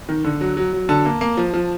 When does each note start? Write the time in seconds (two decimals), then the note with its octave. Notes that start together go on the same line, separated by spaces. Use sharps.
0.09 D#3
0.24 D3
0.41 F#3
0.57 F#3
0.73 F#3
0.89 D3 A5
1.05 A#3
1.21 A#3
1.37 F3
1.54 F3